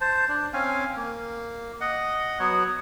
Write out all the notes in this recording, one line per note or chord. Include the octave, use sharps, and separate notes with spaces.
C5 A5
D4
C4 C#4 F5 G#5
A#3
D#5 F#5
F#3 B3 C#5 F#5